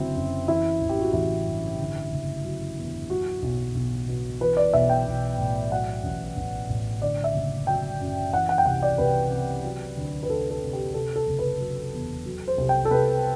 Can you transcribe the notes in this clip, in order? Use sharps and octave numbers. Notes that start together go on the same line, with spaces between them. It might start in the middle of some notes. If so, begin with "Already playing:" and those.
Already playing: F#1 D3 F#3 C4 E4
F#2
E3 E4
A1
G4
F#4
A1 E4
G2
D3
F#1
F#3
E2
F#3 F#4
B1
B1
B2
E3 B4
D5
B1 E5
G5
B1
A2
F#3 F#5
A1
A1
A2
D3 D5
E5
F#1
F#3 G5
F#2
E3 F#5
F#5
G5
C2 F#5
D5
C2 B4
C3
F#3
D2
B4
D2 A4
A4
C3
G4
C3 A4
A4
F#1
B4
F#3
E2
F#3
C5
C2
G5
A4
C2 B4